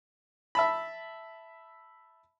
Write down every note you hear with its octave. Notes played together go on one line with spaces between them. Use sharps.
E5 A5 B5